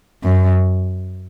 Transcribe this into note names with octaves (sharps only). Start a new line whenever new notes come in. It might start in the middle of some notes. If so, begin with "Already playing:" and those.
F#2